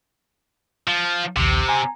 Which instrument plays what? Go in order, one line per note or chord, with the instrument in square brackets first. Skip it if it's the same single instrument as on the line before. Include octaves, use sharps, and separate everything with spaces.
[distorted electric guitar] F3
[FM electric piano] A#1 D#2 [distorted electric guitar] C3
[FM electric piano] G#5 A#5